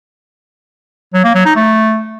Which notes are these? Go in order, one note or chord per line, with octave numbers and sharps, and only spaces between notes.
F#3
A#3
F#3
D#4
A3